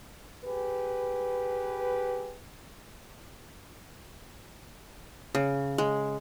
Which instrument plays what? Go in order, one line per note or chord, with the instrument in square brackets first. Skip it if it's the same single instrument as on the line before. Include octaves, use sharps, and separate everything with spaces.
[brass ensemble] G4 G#4 B4
[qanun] C#3
G#3